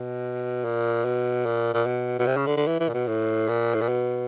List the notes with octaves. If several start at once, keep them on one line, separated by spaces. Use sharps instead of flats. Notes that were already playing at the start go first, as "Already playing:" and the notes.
Already playing: B2
A#2
B2
A#2
A#2
B2
B2
C3
C#3
D3
D3
E3
E3
A#2
B2
A2
A#2
A2
A#2
B2